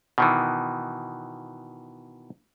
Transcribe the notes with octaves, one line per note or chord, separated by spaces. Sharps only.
B2 D#3 E3